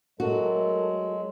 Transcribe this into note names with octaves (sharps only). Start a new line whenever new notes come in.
F#3 G#3 A3 F#4 A4 A#4